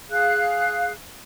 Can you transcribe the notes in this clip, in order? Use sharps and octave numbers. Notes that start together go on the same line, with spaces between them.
G#4 F5 F#6